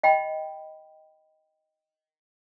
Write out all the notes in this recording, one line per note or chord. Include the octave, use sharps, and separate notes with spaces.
D#5 G5 B5